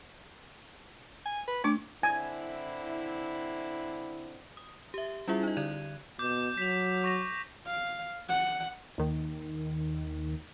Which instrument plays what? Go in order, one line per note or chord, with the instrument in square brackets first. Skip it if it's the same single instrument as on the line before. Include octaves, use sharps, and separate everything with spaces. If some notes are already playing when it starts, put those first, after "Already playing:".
[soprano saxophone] G#5
B4
[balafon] A3 D4 [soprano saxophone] D6
[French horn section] D3 C4 E4 [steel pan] G#5
[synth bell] D#6
G4 E5
G3 C#4 E4 F4 G#4 E5
D#4 D#5
D3 D5 F#6 G#6 D#7
[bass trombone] B2 [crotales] D6 G6
[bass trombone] F#3 [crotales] B6 F7
[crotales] C#6 A#6 F7
[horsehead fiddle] F5
F#5
[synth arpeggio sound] D#2 D#3